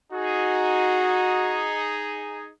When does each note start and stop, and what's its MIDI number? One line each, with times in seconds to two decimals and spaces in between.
0.13 2.51 63
0.13 1.72 66
0.13 2.51 68